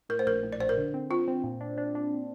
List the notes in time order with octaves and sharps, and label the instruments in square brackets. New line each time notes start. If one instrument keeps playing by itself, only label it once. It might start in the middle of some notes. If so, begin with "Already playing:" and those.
[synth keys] A2 [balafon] A#4
[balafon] C5
[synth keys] A#1 [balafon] A#4
[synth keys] A2
[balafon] D5
[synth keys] A#1 [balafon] C5
[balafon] A#4
[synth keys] D3
C4
[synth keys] C4 [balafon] F4
[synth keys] C4
A#2
D4
D4
D4